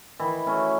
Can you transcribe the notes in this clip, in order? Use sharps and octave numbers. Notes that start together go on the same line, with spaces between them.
D#3 E3 E4
F#3 A3 C#4